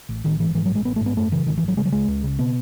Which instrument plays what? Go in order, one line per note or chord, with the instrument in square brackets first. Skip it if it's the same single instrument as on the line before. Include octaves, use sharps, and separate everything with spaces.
[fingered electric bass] A1
A1 D#3
G#2 E3
G#2 E3
F#3
A1
G#3
A1 B3
A3
G#2
B3
F#2 A3
C#3 E3
G#1 D#3
E3
G#1
F#3
C#3 G#3
F#3
C#2 G#3
C#2
C#3
B2 B3